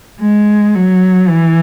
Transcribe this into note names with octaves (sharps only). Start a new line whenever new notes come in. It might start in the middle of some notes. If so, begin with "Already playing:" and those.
G#3
F#3
E3